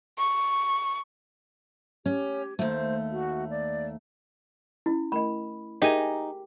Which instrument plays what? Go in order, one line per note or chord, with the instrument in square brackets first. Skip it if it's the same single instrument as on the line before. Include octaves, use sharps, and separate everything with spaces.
[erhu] C#6
[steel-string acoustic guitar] C#4 [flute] G4
[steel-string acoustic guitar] D#2 A3 [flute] C5
[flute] F#4
D5
[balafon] C#4 [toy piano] E4
[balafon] A3 A#4 D#5 [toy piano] B5
[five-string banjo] D#4 [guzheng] G4 G#5 A#5 [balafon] G#4 A#4 E5